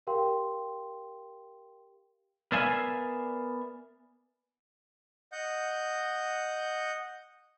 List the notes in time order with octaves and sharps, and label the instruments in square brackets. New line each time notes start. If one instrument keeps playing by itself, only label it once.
[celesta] G4 A#4 F5 G5 C6
[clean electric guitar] B3 A#4 D5 E5 F5 G#5
[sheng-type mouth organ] D#5 F#5 G6